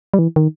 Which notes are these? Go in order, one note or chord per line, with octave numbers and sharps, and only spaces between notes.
G3
E3
D#3